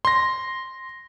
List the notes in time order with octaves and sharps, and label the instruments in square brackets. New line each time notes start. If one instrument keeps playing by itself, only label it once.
[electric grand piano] C6 A#6